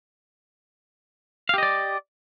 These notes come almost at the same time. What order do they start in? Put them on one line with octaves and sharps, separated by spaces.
F5 G4 D#5 D5